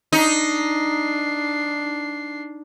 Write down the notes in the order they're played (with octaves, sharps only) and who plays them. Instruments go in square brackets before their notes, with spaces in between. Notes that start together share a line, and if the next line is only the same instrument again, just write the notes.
[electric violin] D4 C7 [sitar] D#4